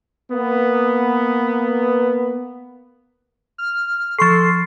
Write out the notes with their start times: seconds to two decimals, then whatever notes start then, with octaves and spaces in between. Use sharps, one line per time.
0.31 A#3 B3
3.58 F6
4.19 F3 A4 C6 C#6 A6 C7